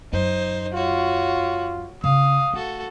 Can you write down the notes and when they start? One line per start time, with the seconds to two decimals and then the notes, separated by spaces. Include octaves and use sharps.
0.13 F#2 D#4 C5
0.74 F4 F#4 C#5
2.04 C#3 F5 D#6
2.53 A3 F#4 A4